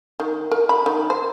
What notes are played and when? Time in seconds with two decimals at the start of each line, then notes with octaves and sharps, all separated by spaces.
0.20 D#3
0.52 A#4
0.69 B5
0.86 D#3
1.10 C5